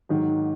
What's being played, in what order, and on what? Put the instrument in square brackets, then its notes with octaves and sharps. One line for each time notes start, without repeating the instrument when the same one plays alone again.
[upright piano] G#2 D#3 F#3